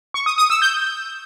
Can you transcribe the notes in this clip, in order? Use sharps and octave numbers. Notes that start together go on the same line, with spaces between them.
C#6
D#6
D#6
E6
G6